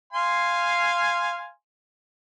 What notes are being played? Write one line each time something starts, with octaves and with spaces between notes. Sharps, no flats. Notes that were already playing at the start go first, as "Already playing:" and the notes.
F5 G#5 C6